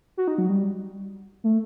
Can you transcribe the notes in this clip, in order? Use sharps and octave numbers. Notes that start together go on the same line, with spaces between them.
F#4
D#4
F#3
G3
A3